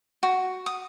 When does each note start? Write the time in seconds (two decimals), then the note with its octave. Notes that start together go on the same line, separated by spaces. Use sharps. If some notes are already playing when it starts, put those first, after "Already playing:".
0.23 F#4
0.66 D#6